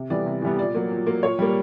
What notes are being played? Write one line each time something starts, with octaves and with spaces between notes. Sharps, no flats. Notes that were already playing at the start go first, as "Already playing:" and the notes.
Already playing: C3
E3 G3 B3 D5
C3
E3 G3 B3
A#2 D5
F#3 A#3
A#2
F#3 A#3
A#2 C#5
G3 A#3